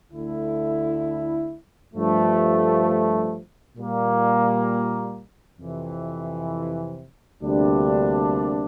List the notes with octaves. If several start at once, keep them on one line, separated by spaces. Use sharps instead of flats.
D2 D3 A3 E4
G2 F3 A3
A#2 G3 A#3
F2 C3 E3
D2 C3 G3 A#3 D4